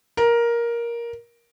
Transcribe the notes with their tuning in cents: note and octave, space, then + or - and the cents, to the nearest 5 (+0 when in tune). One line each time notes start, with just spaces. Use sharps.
A#4 +10